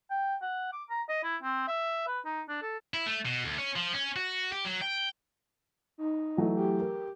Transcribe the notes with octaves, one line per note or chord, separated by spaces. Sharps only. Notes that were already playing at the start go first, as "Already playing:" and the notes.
G5
F#5
D6
A#5
D#5
E4
C4
E5
B4
D#4
D4
A4
E4
A3
B2
D2
C#4
F3
C#4
F#4
G4
F#3
G5
D#4
E3 F#3 A3
G4
A#4